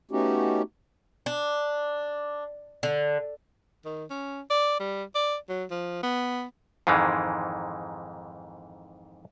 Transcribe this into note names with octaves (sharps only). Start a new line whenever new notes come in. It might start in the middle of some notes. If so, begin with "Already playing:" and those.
A3 B3 C#4 D#4 F#4 G4
D4
D3
D#3
C#4
D5
G3
D5
F#3
F3
B3
F2 G#2 D#3 E3 G#3